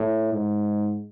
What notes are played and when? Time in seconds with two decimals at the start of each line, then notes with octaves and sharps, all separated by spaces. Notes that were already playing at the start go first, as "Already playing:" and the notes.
Already playing: A2
0.33 G#2